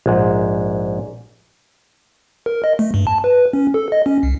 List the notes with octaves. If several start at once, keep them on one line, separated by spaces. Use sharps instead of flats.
A#1 G#2
A#4
D#5
A3
G2
A5
B4
C#4
A4
D#5
C#4
C2